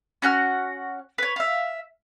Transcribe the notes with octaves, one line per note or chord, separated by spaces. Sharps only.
C#4 F#4 F#5 F6
B4 C#5
E5 F5